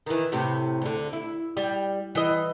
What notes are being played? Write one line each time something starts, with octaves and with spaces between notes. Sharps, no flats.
D#3 E3
A2 C3
D2 D3
E4
G3
E3 D#5